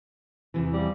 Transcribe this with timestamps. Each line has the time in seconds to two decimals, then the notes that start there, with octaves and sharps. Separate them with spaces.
0.54 E2 C3 E3
0.73 F3 G3